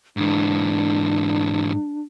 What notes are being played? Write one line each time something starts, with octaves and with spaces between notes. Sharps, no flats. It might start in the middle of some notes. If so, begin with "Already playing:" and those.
G#2 E3 D4